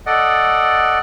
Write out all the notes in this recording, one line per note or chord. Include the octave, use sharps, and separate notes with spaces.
A4 D5 D#5 F#5